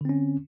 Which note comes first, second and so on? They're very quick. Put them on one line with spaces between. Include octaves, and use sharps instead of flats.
D3 C4 C#4